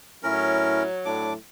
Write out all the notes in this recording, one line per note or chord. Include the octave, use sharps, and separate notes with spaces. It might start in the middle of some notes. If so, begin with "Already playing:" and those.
A2 F#3 C#4 E4 A#4
A2 D4 D6